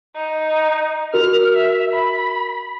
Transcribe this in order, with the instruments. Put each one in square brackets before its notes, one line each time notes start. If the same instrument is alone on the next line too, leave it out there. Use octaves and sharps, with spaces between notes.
[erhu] D#4
[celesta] F#4 A#4 [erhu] F6
[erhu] E5
B5